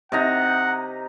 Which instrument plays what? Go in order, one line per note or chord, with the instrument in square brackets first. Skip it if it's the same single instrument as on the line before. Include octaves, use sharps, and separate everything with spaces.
[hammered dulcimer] C3 D#4 A#5 [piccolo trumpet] F#5